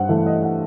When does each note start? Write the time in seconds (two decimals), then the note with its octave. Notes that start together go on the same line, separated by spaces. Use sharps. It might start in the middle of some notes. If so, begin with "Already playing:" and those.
Already playing: G2 C5 F#5
0.09 E3 A3 E5
0.26 D#5
0.43 F#5